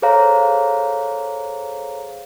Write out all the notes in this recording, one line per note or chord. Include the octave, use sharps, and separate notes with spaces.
G#4 A4 C5 C#5 F5 A#5